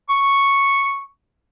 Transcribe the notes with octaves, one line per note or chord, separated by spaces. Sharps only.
C#6